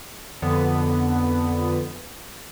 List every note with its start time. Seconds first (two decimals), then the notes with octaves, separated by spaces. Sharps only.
0.42 F2 D3 B3